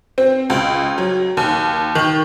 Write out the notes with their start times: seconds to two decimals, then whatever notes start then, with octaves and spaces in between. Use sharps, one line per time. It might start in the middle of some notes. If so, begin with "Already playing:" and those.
0.18 C4
0.50 C#2
0.98 F#3
1.37 D#2
1.95 D#3